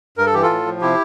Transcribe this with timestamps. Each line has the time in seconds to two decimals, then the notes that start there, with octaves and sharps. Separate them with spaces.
0.18 G2 A#4
0.26 A4
0.34 E3 G4
0.42 F4 A4
0.50 A2
0.66 F3
0.81 C3 E4 G4